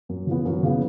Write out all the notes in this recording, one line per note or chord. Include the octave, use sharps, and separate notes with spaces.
F#2
C#3 E3 B3
F#2
C#3 E3 B3